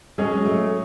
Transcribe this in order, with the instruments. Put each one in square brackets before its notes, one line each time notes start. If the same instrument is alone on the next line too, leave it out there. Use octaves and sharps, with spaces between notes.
[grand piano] F#3 C#4 G#4 [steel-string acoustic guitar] G#3
[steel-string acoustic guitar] A3